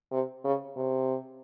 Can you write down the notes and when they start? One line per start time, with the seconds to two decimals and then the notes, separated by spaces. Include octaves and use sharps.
0.12 C3
0.44 C#3
0.77 C3